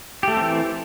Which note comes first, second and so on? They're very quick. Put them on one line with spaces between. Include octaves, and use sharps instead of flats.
G4 A3 A4 C4 E3